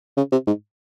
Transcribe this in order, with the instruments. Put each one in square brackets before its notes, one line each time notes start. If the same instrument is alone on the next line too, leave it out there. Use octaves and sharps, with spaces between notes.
[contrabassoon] C#3
C3
G#2